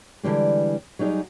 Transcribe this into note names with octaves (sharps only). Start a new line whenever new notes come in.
D3 E3 G3 G#3
F#3 G3 D#4 G#4